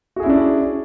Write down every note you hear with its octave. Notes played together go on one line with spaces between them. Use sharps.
C#4 D4 E4 F#4 G#4